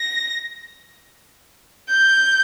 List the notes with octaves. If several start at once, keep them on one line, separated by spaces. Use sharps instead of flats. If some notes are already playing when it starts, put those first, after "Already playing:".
Already playing: A#6
G6